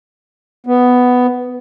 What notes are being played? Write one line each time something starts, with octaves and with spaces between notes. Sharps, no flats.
B3